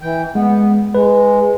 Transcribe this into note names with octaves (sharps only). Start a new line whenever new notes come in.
E3 G5
G#3 B3
G#3 B4